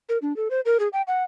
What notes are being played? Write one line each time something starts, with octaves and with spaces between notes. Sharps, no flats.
A#4
D4
A4
C5
A#4
G#4
G5
F#5